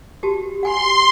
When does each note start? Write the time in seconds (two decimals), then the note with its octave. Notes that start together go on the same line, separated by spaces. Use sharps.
0.23 F#4 G4 A5
0.63 F#5 G#5 B5 C6